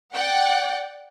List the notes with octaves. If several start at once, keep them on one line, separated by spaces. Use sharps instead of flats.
D5 F#5 G5